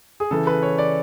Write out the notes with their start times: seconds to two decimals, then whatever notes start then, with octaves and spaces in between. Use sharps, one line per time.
0.20 G#4
0.31 C#3 E3 A4
0.47 B4
0.63 C#5
0.78 D5